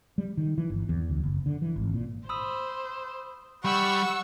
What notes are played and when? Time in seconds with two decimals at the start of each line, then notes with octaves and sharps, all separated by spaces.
0.18 G3
0.37 D#3
0.58 E3
0.70 G1
0.89 E2
1.10 D2
1.24 F#1
1.46 D3
1.62 E3
1.76 G#1
1.94 A#2
2.29 C5 B5 D#6 E6
3.65 G3 F#5 B5 C#6 E6